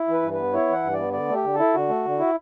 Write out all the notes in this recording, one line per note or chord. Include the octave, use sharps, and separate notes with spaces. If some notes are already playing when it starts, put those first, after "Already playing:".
Already playing: E4
E3 B4
G2
B3 B4
E4 C#5
E3 F#5
G2
B3 D5
D3 D5
A3
G4
D3
A4
E4
D3 F#4
A3
D3
E4